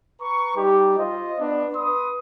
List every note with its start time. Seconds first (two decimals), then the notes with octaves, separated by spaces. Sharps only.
0.20 B4 A#5 C#6
0.55 G3 D#4 G4
0.98 F4 C5 D#5
1.39 B3 D4
1.74 B4 C6 D#6